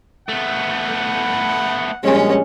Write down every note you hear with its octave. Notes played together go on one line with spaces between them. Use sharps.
A3 B3 F#5
A#1 G3 G#3 C#4